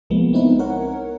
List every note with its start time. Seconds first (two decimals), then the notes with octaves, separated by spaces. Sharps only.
0.10 C2 F3 G#3 A#3 B3
0.33 B3 C4 D#4 E4 B4
0.59 A#4 C#5 F#5